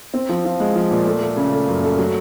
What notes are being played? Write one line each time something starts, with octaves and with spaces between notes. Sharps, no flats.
C4
F3
F3
G#3
F3
A#2
A3
A3
C#3
A3
F#2
A3
F#3